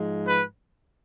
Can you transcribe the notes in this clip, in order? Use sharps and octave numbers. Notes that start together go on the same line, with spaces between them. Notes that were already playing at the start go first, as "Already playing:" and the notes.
Already playing: G#2 F3 G#3
B4